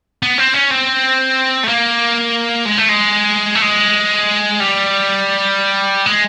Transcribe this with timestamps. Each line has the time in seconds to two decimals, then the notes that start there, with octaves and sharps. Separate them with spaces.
0.23 B3
0.38 C4
0.54 C#4
0.70 C4
1.63 A3
1.68 A#3
2.65 G#3
2.78 A3
2.89 G#3
3.55 A3
3.62 G#3
4.60 G3
6.06 G#3